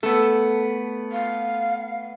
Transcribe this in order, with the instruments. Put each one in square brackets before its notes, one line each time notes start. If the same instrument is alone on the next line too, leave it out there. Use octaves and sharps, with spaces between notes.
[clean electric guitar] A3 B3 [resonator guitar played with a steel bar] A4
[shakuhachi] F5